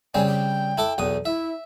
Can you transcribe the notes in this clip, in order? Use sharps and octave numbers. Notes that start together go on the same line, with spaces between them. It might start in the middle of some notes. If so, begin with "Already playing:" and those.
C#3 G3 C4 G#5
G5
E4 A4 D6
B1 E2 D#6
E4 E5